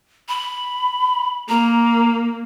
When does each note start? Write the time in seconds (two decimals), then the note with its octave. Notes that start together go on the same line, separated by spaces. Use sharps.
0.29 B5
1.49 A#3 A#5